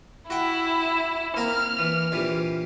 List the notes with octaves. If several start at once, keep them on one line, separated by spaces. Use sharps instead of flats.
E4 F#4 G5
A#3 C4 A#4 F6
E3
A#1 C3 E3